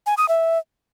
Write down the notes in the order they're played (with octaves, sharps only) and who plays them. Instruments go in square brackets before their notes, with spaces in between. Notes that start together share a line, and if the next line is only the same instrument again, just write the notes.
[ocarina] G#5
D#6
E5